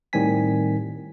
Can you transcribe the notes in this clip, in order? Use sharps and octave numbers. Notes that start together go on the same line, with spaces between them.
A2 D#3 G3 C4 G#5 B6